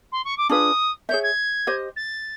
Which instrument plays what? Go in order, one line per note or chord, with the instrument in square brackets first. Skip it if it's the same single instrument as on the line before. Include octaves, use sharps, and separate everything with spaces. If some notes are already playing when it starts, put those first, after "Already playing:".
[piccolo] C6
C#6
D6
[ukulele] D4 F4 G#4 B4 [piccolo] D#6
[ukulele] G#4 C#5 E5 [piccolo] G6
[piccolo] G#6
[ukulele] G4 C5 D#5
[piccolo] A6